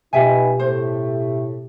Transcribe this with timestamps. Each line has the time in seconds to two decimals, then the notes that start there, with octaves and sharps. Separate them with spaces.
0.13 B2 D#4 F4 G4 B4 E5 G5 G#5
0.59 A2 A3 C5